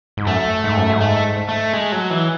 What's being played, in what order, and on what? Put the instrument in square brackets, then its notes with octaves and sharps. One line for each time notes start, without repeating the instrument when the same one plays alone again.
[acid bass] G#2
[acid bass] F#2 [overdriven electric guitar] A3
[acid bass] G#2
F#2
G#2
[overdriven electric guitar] A3
A3
G#3
F#3
E3